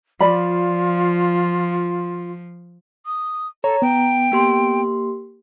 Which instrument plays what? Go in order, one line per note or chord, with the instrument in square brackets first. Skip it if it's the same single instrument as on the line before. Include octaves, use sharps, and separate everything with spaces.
[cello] F3 [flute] F4 [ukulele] D5 B5
[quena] D#6
[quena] A4 [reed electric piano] C#5 [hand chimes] A#5
[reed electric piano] B3 [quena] G5
[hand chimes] A#3 G4 C6